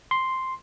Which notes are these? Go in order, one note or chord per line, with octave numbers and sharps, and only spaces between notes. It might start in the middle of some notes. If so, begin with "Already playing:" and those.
C6